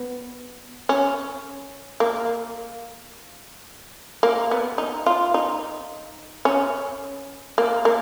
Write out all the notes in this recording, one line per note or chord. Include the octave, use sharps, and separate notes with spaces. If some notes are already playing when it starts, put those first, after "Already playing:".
Already playing: B3
C#4
A#3
A#3
B3
D#4
F4
D#4
C#4
A#3
A#3